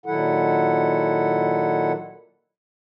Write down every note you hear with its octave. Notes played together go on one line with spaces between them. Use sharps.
A#2 D#3 F#3 E4 A4 F#5